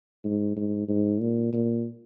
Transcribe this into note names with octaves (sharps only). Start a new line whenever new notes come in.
G#2
G#2
G#2
A#2
A#2